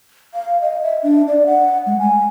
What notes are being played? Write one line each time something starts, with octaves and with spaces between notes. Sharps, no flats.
F5
D#5
E5
D4
D5
F#5
G#3
G#5